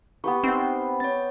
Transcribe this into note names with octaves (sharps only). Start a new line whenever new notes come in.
B3 G4 B4 C#6
C4 D#4 F#5
C#5 A6